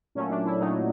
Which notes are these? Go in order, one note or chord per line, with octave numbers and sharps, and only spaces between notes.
A#2 F#3 A3 C#4
D4
E4
A#2 F#3 A3 D#4